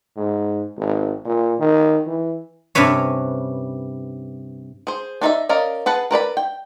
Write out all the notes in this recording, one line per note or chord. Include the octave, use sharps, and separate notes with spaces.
G#2
G#1
A#2
D#3
E3
G2 C3 C#4 B4 C#5
G#4 C5
D4 D#4 D5 E5
C#4 A#4 D5 D#5 F5
G#4 B4 F#5 A5
A#4 B4 D5 B5
G5